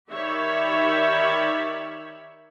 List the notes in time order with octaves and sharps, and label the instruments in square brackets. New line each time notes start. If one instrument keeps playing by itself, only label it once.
[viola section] D#3 G4 C#5 D5 E5 B5